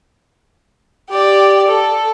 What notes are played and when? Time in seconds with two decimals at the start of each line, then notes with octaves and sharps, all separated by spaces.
1.10 G4 D5
1.68 A4